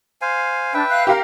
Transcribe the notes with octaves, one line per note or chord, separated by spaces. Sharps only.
C5 F5 G#5
D4 B4 E5 G5
F5 F#6
G4 A#4 F5